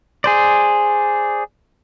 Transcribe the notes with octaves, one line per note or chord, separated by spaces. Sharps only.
G#4 C5 D5